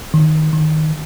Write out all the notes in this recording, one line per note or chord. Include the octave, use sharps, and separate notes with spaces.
D#3
D#3